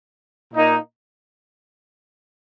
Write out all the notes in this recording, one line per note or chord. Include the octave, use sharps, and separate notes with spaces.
A#2 A#3 D#4